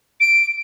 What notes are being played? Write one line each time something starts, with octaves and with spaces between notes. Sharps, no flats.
D7